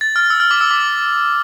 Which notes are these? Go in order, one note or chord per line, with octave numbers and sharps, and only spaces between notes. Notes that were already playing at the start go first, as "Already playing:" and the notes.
A6
F6
E6
F6
D6
E6
D6